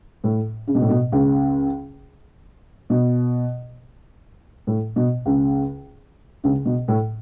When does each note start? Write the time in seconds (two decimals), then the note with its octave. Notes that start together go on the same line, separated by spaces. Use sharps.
0.24 A2
0.67 C#3
0.75 B2
0.82 A2
0.89 B2
1.12 C#2 C#3
2.90 B2
4.67 A2
4.96 B2
5.26 C#2 C#3
6.44 C#2 C#3
6.65 B2
6.88 A2